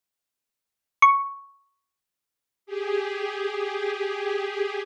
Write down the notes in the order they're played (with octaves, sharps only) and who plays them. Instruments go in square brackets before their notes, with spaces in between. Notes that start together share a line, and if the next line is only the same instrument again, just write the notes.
[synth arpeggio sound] C#6
[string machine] G4 G#4